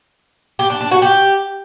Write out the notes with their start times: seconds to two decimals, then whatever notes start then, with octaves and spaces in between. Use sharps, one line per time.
0.59 G4
0.70 D4
0.81 D4
0.91 F#4
1.02 G4